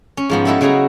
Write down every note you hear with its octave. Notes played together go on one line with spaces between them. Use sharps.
C#4
G#2 F3 B3
G3 G#3 E4 A4 B4 D#5
C#3 F#3 F#4 G#4 A#5